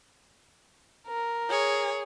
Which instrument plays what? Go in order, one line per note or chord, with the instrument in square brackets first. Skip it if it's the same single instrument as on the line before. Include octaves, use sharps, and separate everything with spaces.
[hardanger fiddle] A#4
[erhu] G#4 [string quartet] C#5